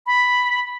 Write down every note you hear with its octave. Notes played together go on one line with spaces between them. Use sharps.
B5